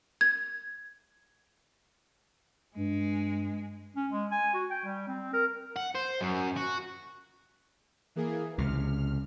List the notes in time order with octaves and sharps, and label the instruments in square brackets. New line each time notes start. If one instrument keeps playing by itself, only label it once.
[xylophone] G#6
[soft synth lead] G2 [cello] G#3
[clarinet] C#4
G#3
G#5
F#4
G5
G3
C4
A#4
[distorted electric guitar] F#5
C5
F#2
F#4
[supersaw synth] E3 A#3 G#4
[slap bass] C#2 C3 [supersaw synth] F6